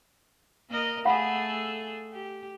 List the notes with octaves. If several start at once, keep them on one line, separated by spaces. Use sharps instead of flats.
A#3 A#4 D#5
A3 G#4 A4 F5 F#5 B5
G4